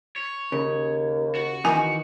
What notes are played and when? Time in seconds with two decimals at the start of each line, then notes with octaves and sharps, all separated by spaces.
0.16 C#5
0.52 D#2 C#3
1.35 F#4
1.65 D#3 E3 D#4 G#5